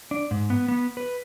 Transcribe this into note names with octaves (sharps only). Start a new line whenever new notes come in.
D4
G#2
B3
B3
B4